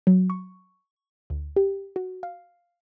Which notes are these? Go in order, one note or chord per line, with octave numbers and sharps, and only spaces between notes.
F#3
C#6
D2
G4
F#4
F5